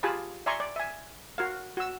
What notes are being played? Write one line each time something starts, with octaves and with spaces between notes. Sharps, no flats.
F4 G4 G#4 G#5 A5 B5
D5 E5 G#5 A#5 C6 C#6
D5
E5 G#5
F#4 A#4 F5
F#4 E6